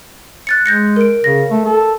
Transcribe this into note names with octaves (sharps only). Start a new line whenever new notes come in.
F#6 A6 C#7
G#3 G6 A#6 C#7
A#4 D7
C#3 A#6
A3
A4